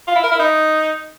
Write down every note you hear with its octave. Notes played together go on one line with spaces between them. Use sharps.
F4
E4
A#4
E4
D#4